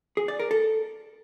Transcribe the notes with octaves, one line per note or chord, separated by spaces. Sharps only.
G#4
D5
A#4
A4